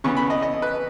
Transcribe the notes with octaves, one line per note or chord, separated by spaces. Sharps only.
C#3 E3 B3 C#6
B5
D#5
D#5
B4